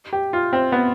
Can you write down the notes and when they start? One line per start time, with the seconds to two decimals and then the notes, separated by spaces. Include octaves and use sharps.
0.13 G4
0.33 F4
0.53 C4
0.72 B3